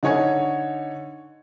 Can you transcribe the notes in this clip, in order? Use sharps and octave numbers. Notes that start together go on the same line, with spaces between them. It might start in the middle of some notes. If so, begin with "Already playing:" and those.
D3 D#4 C#5 G#5 G#6